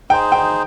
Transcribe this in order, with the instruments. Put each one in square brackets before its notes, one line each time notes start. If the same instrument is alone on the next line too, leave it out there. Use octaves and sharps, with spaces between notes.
[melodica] D#4 G#4 C5 [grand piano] G5
[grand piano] G5